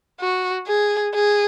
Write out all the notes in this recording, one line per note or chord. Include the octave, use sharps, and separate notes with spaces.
F#4
G#4
G#4